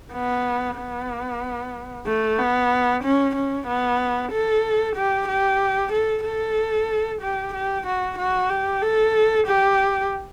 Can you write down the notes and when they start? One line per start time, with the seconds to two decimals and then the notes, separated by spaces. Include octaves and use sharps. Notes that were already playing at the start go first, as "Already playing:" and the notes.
0.14 B3
0.78 B3
2.06 A3
2.39 B3
3.03 C#4
3.35 C#4
3.67 B3
4.32 A4
4.96 G4
5.28 G4
5.92 A4
6.25 A4
7.21 G4
7.54 G4
7.86 F#4
8.18 F#4
8.50 G4
8.82 A4
9.47 G4